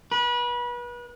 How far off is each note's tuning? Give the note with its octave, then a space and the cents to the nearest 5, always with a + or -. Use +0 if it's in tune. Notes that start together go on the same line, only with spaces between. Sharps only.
B4 -30